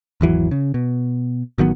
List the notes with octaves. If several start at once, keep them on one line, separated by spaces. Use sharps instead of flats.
G#1 E2 E3 F#3
C#3
B2
A1 D#3 F#3 B3